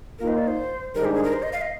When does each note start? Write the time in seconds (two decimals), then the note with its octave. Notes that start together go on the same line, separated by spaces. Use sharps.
0.19 D#3 A#3 F4 A#4
0.28 C5
0.38 D5
0.48 C5
0.94 G#2 D#3 G3 D4 A#4
1.05 G4
1.14 G#4
1.23 A#4
1.33 C5
1.43 D#5
1.53 F5
1.61 D#5